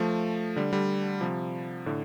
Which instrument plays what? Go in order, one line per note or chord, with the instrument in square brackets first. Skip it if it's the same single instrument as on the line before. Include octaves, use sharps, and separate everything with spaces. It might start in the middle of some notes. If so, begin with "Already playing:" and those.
Already playing: [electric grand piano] F3 A3
D3 G3
D3 G3
C3 F3
A2 D3